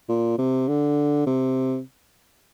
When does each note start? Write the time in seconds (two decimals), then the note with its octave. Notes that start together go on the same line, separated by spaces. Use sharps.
0.09 A#2
0.38 C3
0.68 D3
1.27 C3